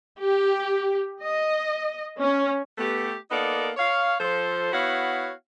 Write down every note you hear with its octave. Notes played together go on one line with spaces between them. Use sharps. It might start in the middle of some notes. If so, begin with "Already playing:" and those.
G4
D#5
C#4
A3 B3 G4
A#3 B3 D#4 A4 A#4 D5
C#5 F5
F3 A4 C5
B3 E4 F#4 C#5 F5 F#5